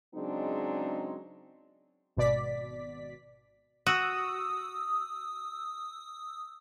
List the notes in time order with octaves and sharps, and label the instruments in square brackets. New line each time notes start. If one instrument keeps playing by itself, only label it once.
[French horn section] C#3 F#3 G#3 C4 D4 D#4
[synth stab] G#1 B2 D5 B6
[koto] F#4 [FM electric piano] D#6 E6